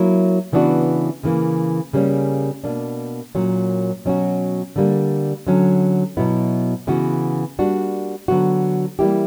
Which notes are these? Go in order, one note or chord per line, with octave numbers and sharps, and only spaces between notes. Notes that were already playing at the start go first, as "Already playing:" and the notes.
Already playing: F#3 A#3 E4
C#3 E3 B3 D4 F#4
C#3 E3 A#3
C#3 G3 A#3 C#4
B2 A#3 D4
A#2 F#3 A#3 C#4
B2 F#3 C#4 F#4
D3 G3 A#3
D3 F#3 C#4
B2 F#3 B3 E4
C#3 E3 B3 F#4
G3 A#3 D4 F#4
D3 F#3 B3 F#4
E3 G3 A#3 E4 G4